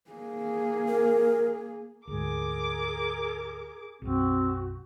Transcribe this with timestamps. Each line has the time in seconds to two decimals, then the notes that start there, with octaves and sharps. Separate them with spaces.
0.11 A#3 G#4
0.88 A#4
2.08 D2 G#2 G#4 A#4 D6
4.02 B1 F#2 C4 F#4